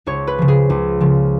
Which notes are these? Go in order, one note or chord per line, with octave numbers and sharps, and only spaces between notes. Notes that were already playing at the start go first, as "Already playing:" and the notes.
C#2 C#5
B4
C#3 F3
G#4
C#2
C#3 F3